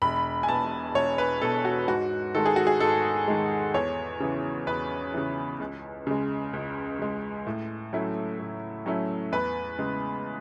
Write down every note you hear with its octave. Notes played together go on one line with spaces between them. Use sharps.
E1 B5
G#5
E2 B2 A5
E1 C#5
B4
E2 B2 A4
F#4
G#2 F#4
D#3 G#3 A4
G#4
F#4
G#4
G#2 A4
D#3 G#3
E2 C#5
C#3 E3
E2 B4
C#3 E3
C#2
C#3 G#3
C#2
C#3 G#3
A2
F#3 A3 C#4 E4
A2
F#3 A3 C#4 E4
E2 B4
C#3 G#3